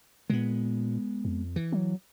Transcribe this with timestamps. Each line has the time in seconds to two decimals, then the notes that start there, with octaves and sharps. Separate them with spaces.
0.30 A#2 G#3 B3
1.25 F2
1.56 E3
1.72 F#3